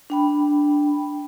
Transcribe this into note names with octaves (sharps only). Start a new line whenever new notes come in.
D4 G5 B5